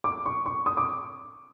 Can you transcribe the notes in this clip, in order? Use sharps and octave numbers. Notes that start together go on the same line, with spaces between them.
D6
C#6
C#6
D#6
D6